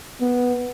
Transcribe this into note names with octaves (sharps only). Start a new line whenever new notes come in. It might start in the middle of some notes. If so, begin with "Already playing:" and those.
B3